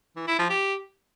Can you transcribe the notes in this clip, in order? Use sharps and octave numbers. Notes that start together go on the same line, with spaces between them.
E3
E4
F3
G4